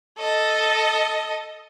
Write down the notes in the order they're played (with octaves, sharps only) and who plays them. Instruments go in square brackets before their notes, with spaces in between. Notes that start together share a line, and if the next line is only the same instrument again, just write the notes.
[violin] A4 D#5